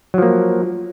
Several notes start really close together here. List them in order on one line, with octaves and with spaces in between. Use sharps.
F#3 F3 A#3